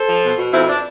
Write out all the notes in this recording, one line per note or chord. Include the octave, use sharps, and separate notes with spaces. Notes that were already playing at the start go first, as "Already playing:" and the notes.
Already playing: A4 C5
F3
B2
B2
F2 C4 E4
D4